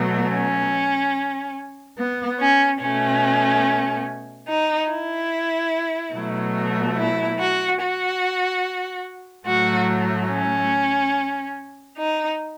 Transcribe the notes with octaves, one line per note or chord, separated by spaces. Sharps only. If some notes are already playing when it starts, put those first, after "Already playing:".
Already playing: B2 F#3 A3
C#4
B3
C#4
B2 A3 C#4
D#4
E4
B2 F#3 A3
E4
F#4
F#4
A2 F#3 A3 F#4
C#4
D#4